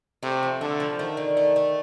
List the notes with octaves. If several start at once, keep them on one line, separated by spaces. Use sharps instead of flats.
C3 A3
F3
D3 A3
F3
D#3 A3
D3
A3
A3